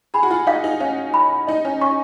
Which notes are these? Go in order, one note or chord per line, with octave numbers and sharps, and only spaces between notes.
G#4 B5
F#4
F4
D#4 F5
D#4
C#4 F5
B5
D#4 D#5
C#4
C#4 C#6